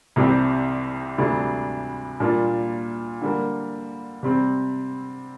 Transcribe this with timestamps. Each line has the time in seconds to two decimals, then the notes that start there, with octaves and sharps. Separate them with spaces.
0.16 C2 C3 G3 C4 G4
1.18 D2 C3 G3 D4
2.20 A#2 G3 A#3 D4 F4
3.22 D3 G3 A#3
4.23 C3 G3 C4